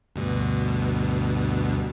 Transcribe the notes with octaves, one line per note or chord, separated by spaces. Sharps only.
D2 G2 B2